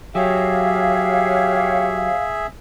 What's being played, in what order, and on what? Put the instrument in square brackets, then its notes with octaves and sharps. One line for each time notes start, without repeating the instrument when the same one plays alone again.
[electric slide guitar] F#3 [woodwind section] G4 C#5 [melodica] G#4 E5 [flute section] F5